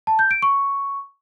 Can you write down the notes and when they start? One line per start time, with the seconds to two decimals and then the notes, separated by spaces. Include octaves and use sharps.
0.07 A5
0.19 G6
0.31 D7
0.42 C#6